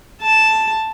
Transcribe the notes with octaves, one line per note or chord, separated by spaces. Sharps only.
A5